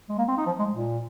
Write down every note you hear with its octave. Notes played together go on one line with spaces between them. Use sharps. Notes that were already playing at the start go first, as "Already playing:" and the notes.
G#3
A#3
C4
D#4
F3
G#3
A#2